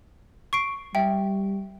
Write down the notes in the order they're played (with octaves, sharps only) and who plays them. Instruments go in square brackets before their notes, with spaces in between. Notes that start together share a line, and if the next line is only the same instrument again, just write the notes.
[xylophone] C#6 C7 D7
[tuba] G3 [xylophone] E5 G5